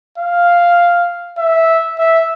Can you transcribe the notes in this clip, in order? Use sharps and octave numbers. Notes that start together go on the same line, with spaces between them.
F5
E5
E5